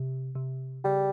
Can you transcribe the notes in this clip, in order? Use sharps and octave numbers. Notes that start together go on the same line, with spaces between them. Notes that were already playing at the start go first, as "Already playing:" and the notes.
Already playing: C3
C3
C#3 G3